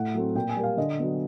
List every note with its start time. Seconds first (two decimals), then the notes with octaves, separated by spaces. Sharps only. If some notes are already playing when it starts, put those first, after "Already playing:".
Already playing: A2 F#5
0.14 F#3 A3 C4
0.35 A#2 G5
0.49 G#5
0.57 G3 A#3
0.63 F5
0.77 D3 D#5
0.99 F#3 B3